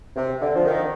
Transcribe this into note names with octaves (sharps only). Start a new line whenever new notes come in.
C3
D3
F3
D#3